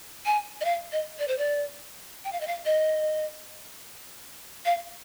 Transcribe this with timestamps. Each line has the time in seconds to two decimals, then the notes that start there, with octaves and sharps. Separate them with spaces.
0.26 G#5
0.61 D#5
0.65 F5
0.92 D#5
1.19 D5
1.28 C5
1.38 D5
2.25 G5
2.33 F5
2.41 D#5
2.47 F5
2.66 D#5
4.66 F5